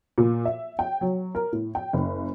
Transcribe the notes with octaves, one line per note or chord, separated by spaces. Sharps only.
A#2
E5
G5
F#3
A#4
A2
G5
F#1